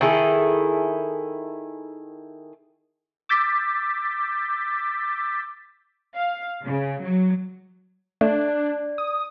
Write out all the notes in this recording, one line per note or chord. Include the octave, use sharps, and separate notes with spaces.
D#3 E4 G#4 A4
D6 E6 G6 A6 B6
F5
C#3
F#3
A3 D4 D5
D#6